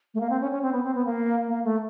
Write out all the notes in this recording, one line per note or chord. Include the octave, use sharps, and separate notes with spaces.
A3
A#3
C4
C#4
C#4
C4
B3
C4
B3
A#3
A#3
A3